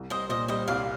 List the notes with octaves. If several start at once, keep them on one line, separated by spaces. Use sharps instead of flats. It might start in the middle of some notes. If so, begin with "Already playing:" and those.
Already playing: C2
C2 C5 D#5
A#2 C5 D#5
G3 C5 D#5
C2 D5 F5